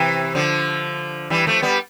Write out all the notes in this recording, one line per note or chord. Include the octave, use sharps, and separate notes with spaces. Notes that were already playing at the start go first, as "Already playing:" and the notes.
Already playing: C3 E3
D3 F3
E3 G3
F3 A3
G3 B3